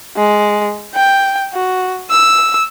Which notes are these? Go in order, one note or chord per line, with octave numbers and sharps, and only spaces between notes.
G#3
G5
F#4
E6